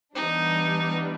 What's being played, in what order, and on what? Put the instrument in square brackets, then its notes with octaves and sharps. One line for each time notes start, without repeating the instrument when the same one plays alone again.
[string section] E3 G3 B3 D4 [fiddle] D#4